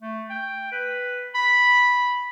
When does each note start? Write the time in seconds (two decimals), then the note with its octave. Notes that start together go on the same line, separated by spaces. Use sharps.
0.02 A3
0.30 G5
0.72 B4
1.35 B5